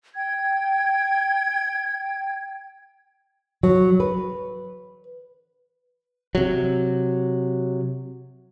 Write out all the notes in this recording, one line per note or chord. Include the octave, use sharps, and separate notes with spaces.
G5 G#6
F#3
B4
C3 F#3